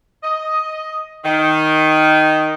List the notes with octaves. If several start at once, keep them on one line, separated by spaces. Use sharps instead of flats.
D#5
D#3